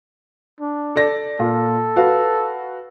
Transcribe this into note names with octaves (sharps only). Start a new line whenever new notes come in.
D4
A4 D5 A#6
A#2 F4 A4
F#4 B4 F5